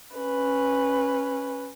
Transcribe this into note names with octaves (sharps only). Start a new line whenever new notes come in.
C#4 B4